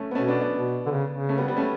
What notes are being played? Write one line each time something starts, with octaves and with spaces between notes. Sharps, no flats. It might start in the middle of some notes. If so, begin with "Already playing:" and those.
Already playing: A3 C#4
B3
B2 A3 C#4
B3 D4
B3 D4
B2
D3
C#3
C#3
A3 C#4
G3 B3
G3 B3
A3 C#4